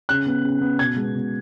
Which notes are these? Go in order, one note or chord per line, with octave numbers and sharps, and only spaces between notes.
C#3 F#6
B3
C#3
B3
B2 G#6
G#3 B3
B2